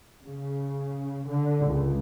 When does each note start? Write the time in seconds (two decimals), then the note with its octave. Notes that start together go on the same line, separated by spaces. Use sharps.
0.24 C#3
1.29 D3
1.66 C#2